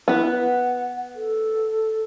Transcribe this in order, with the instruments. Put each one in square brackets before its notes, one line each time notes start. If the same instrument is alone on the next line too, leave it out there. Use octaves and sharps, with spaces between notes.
[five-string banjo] B3 B4 [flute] E4
[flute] F#5
A4